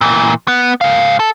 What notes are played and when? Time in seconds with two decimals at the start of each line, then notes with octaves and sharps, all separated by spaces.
0.01 A#2 E3
0.48 B3
0.81 G#2 F5
1.19 A4